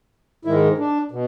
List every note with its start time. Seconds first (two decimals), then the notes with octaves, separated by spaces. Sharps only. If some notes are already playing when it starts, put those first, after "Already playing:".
0.45 G#2 D#3 G#3 E4
0.78 D4
1.12 B2